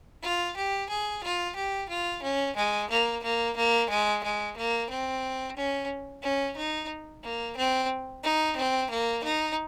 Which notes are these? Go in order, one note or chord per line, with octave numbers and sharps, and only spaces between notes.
F4
G4
G#4
F4
G4
F4
C#4
G#3
A#3
A#3
A#3
G#3
G#3
A#3
C4
C#4
C#4
D#4
A#3
C4
D#4
C4
A#3
D#4